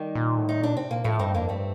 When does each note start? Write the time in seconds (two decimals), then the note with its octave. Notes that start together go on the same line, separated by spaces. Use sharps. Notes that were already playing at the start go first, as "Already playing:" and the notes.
Already playing: D#3 G3
0.15 A#2
0.37 A2
0.49 D#4
0.60 A#2 D4
0.75 C3 C4
0.90 A#2 A#3
1.04 A2 F3 A3
1.19 G2 C4 D#4
1.34 F2 A#3 D4
1.49 G2 A3 C4